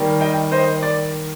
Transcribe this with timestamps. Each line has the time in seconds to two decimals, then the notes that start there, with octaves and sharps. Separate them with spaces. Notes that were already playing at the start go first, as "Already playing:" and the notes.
Already playing: D#3 G3 A#3
0.21 D#5 G5
0.52 C5 D#5
0.83 D5